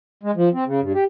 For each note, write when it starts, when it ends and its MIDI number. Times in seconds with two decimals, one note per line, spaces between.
0.23 0.31 56
0.36 0.49 53
0.53 0.64 60
0.66 0.80 49
0.80 0.93 43
0.94 1.04 67